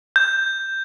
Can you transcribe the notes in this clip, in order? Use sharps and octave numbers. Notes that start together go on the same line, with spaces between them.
G6